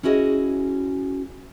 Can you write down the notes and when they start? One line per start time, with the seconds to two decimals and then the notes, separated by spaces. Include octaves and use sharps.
0.03 C#4 E4 F#4 G#4 D5 D#5